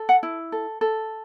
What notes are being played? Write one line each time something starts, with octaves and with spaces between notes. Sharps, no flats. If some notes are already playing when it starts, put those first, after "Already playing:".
Already playing: A4
F#5
E4
A4
A4